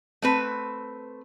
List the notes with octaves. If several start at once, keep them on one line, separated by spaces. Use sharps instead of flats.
A3 C4 B4